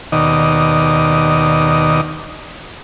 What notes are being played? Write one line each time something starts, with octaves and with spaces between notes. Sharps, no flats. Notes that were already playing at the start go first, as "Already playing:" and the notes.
D#2 B2 D#3 D5 D#5